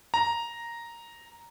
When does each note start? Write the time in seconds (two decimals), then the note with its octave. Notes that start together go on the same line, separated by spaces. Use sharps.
0.14 A#5